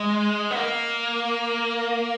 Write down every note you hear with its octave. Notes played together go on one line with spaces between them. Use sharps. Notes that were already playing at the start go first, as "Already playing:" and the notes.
Already playing: G#3
B3
A#3